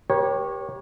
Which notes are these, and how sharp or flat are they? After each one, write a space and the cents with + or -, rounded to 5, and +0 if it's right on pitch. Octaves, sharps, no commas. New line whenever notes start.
G4 +5 A#4 +45 C#5 -15